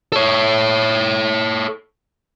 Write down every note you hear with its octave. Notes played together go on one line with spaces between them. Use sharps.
A4 C#5